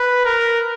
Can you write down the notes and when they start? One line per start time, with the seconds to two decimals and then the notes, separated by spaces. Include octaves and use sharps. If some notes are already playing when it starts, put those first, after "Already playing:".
Already playing: B4
0.25 A#4